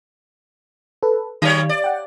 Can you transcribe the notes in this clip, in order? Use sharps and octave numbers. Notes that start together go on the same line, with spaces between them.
A4 B4
D#3 F#3 G3 C#5
D5
F#5 G5